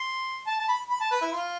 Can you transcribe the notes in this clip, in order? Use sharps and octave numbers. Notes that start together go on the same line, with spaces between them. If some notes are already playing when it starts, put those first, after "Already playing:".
Already playing: C6
A5
A5
B5
B5
A5
B4
E4
F4